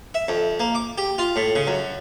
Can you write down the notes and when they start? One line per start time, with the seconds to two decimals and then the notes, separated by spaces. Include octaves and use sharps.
0.14 E5
0.28 F2
0.59 A#3
0.75 D6
0.98 G4
1.18 F4
1.36 A2
1.55 C#3
1.67 F#2